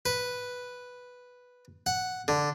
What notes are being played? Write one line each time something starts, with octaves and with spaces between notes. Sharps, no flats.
B4
F#5
D3